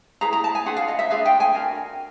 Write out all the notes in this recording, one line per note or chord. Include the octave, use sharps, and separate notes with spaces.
E4 G#4 B4 A#5
A#5
A5
G#5
D4 F4 G#4 B4 F#5
F5
D#5
E5
D4 F4 G#4 B4 F5
G5
G#5
D4 F#4 A#4